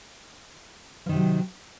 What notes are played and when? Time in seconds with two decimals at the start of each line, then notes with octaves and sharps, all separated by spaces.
1.06 F3
1.09 D#3
1.12 C3
1.16 F#3